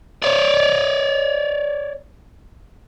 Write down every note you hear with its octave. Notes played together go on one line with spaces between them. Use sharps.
C#5 D5